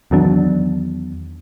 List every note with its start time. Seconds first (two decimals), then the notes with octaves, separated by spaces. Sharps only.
0.11 E2 D#3 F#3 D4